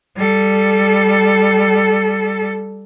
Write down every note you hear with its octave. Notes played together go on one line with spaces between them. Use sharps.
G3 A4